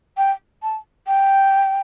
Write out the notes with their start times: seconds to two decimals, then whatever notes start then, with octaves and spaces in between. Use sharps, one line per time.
0.17 G5
0.63 A5
1.07 G5